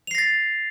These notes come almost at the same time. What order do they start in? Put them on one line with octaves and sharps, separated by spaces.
F7 C7 A#6 A6